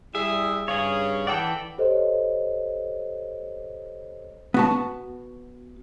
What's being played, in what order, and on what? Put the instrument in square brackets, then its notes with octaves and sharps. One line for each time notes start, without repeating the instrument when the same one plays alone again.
[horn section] G3 E4 G#4 [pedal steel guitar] E5
[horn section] G2 C#3 [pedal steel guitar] G#4 C#5
[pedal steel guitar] E3 A4 D5 [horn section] F#5 G5
[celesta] G4 A4 C5 C#5 D#5
[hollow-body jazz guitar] B3 F#4 A5